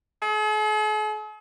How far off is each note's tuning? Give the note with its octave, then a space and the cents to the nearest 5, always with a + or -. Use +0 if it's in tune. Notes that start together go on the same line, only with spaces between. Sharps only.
G#4 +45